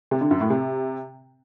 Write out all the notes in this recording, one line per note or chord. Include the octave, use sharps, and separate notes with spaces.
C3
D3
F#2
A2
C3